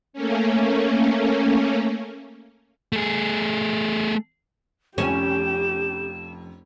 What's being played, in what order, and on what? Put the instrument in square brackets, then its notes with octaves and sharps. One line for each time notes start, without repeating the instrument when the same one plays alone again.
[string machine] A3 A#3 C#4
[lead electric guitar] A3 G#4
[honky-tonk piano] F1 F2 [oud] C#4 [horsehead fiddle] G4 [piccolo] E7